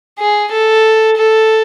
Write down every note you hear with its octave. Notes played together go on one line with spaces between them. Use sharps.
G#4
A4
A4